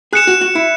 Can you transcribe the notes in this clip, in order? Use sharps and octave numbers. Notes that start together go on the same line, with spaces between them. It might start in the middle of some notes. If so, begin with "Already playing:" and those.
G#4 F#6 C#7 E7
F#4
F#4
E4